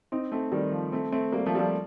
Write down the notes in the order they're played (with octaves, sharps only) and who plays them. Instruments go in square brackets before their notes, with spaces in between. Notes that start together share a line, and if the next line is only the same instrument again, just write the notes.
[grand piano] C4 D#4
A3 C4
D#3 G3
F3
A3 C4
A3 C4
G3 A#3
F3 A3
G3
F3 A3